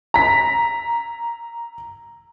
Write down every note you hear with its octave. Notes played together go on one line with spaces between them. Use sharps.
A#5 B6